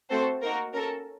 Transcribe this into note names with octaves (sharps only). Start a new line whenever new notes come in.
A3 C4 F#4 A4 C5
A#3 D#4 F#4 A#4
C#4 A4 A#4